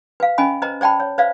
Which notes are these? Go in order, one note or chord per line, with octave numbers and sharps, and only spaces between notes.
B4 F5
C#4 D#5 G#5 B5
B4 C5 D#5 A#5
C5 D5 G5 A5 B5
C#5
B4 C5 D5 E5 F5